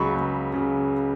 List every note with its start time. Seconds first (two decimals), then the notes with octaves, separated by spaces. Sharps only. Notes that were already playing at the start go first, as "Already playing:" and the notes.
Already playing: C#2 C#3 F#3 B5 C#6
0.14 C#2
0.53 C#3 F#3